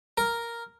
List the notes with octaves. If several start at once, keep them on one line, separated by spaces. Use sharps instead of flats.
A#4